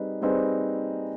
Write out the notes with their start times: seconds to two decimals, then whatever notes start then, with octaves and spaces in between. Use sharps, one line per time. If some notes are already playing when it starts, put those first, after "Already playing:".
Already playing: G3 C4 D#4 G#4 B4
0.21 G3 C4 D#4 G#4 B4